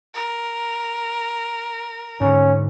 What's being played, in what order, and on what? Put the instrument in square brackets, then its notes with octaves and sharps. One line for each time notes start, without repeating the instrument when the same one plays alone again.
[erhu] A#4
[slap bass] G#2 D3 [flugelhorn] C#4